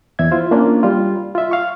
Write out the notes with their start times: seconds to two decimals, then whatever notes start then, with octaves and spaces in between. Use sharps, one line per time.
0.19 E2 E5 G#6
0.31 E4 F4 C5
0.51 A#3 C#4 D4 F4
0.83 G3 F4
1.35 F4 E5
1.51 F5 C#6